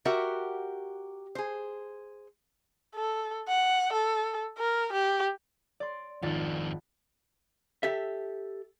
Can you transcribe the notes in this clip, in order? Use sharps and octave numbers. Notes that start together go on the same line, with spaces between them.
F#4 G4 A#4 E5 F#5
G#4 C5
A4
F#5
A4
A#4
G4
D5 C6
G#1 F2 D#3 F4 D5
G4 A4 E5